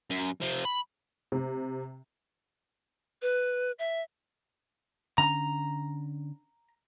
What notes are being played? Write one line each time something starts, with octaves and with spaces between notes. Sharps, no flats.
F#2
C3 F3
B5
C3
B4
E5
D3 C#4 D4 A#5